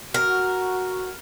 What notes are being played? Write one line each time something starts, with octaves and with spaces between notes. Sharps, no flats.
F#4 A#4